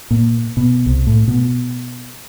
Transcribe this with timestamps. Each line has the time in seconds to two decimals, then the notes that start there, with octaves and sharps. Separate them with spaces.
0.11 A#2
0.57 B2
0.86 C2
1.07 A2
1.28 B2